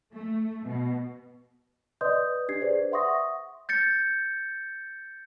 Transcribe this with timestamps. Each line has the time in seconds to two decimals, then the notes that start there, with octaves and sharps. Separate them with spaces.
0.13 A3
0.66 B2
2.01 B4 D5 D#5 C6 D#6 G6
2.49 D4 G4 G#6 C7
2.62 G#4 B4 C5 D5
2.92 E5 F#5 C6 C#6 D#6 A#6
3.69 G6 A6 C#7